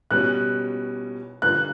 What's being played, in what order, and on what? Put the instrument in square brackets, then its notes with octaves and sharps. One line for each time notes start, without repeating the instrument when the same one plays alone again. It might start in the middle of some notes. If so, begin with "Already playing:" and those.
[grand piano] B2 G3 C#4 [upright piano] F#6
[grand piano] G2 D3 A#3 [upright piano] F#6